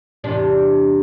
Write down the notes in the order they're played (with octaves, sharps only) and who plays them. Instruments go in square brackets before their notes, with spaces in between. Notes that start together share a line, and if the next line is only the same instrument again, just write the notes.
[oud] E2 C3 D4